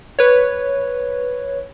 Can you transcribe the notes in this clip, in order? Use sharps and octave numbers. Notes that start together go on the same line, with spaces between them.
B4 C#5